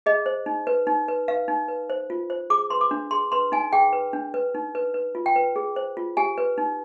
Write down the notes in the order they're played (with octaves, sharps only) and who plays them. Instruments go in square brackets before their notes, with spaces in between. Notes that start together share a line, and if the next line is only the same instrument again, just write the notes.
[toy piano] G#4 D#5
C5
D#4
B4
D#4
B4
B4 F5
D#4
B4
C5
F4
C5
G#4 D6
B4 C6
D6
D4
G#4 C6
B4 C6
D#4 G#5
G#4 G5
B4
D4
B4
D#4
B4
B4
F4
G5
B4
G#4
C5
F4
G4 G#5
B4
D#4